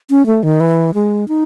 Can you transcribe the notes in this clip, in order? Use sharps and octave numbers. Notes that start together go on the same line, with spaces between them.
C#4
A3
D#3
E3
G#3
D#4